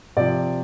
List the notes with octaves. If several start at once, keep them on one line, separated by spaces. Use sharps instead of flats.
C3 F3 D5